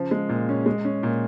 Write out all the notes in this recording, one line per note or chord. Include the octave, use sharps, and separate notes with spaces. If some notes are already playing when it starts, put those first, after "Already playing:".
Already playing: C#3 F3
G#3
A#2
C#4
G#3
C#4
A#2